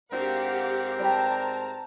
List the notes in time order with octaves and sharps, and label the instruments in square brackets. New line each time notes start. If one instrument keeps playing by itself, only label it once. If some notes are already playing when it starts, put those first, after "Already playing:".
[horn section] G#2 C4 A#4 [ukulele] D4 F#4 [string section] G4 F5 F#5
[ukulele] G4 B4 D5 [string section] A5 A#5